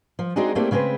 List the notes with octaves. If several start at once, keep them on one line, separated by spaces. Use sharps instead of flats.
F3
G#3 C4 D4 D#4 F#4 G#4
A3 A#3 C4 D4 E4 G4
C#3 G#3 C4 G#4 B4